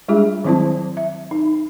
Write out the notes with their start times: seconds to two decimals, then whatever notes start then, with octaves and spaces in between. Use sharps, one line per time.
0.08 G3 G#3 D4 F4 G#4
0.44 D#3 F#3 C4 E4 C5 A5
0.97 E5
1.31 D#4